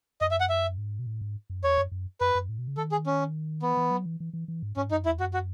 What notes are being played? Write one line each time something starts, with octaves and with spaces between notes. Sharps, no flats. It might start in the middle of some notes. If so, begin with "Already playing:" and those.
F#2 D#5
E5
F#5
E5
G#2
B2
A2
G#2
F#2
E2 C#5
F#2
F#2
F#2 B4
F#2
A2
B2
C#3
D#3 A4
G#4
C#4
E3 B3
E3
F#3
E3
E3
E3
E3
G#2
G#2 C#4
F#2 D#4
E2 E4
F#2 F#4
F#4